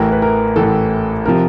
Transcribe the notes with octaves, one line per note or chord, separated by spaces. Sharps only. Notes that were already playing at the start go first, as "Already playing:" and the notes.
Already playing: A1 A2 E3 A#4
B4
A#4
A1 A2 E3 A4
C3 F3 A#4